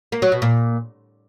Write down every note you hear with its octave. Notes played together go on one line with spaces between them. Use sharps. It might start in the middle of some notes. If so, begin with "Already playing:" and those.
A#3
F#3
B2
A#2